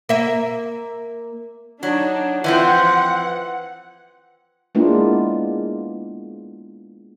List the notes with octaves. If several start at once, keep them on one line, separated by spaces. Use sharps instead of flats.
A#3 E5
F#3 D4 D#4
E3 F3 C4 F#5
G#3 A#3 B3 D4 E4 F4